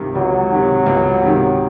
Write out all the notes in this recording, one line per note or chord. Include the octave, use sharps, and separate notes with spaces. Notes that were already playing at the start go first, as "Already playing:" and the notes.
Already playing: C#2 C3 D#3
C#2 F#3
C3 D#3
C#2
C3 D#3